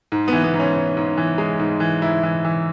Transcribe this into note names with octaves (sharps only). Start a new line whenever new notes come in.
G#2
E3 B3
B3
G#2
C#4
G#2
G#2
E3
G#3
G#2
E3
G#2 E4
E3
E3